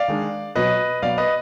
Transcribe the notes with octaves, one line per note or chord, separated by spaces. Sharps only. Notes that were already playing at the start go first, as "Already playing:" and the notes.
Already playing: D5 F5
D#3 G#3 D4
B2 F#3 B3 B4 D#5
B2 F#3 B3 D5 F5
B4 D#5